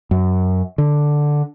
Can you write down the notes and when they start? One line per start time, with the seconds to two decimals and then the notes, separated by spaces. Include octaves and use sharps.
0.11 F#2
0.78 D3